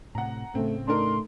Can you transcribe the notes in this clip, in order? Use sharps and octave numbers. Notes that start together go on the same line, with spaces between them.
A2 C3 F#5 A#5
A2 C#3 A3 C4
A3 D4 D#4 A#4 C6